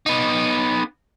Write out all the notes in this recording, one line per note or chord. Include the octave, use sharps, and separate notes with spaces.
B3 D#4